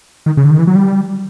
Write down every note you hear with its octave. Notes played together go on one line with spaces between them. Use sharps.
D#3
C#3
D3
D#3
E3
F#3
G3